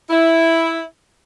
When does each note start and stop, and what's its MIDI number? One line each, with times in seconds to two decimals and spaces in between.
0.09 0.82 64